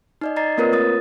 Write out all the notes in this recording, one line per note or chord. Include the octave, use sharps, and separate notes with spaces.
D#4 D5 D#5
D5 D#5 A#5 A6 C7
A#3 C4 F4 A#4 B4 C#5
A3 F4 D#6 A6